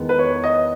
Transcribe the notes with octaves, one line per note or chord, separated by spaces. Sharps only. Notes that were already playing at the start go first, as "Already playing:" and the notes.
Already playing: E2 D#3 G#3 B3
B4
C#5
D#5